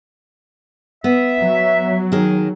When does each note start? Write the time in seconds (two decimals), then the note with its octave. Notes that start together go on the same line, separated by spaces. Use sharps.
1.04 B3 E5
1.39 F#3
2.12 D#3 G#4